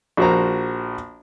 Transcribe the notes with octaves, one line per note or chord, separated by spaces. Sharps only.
A#1 F#4 A#4 C5 A#5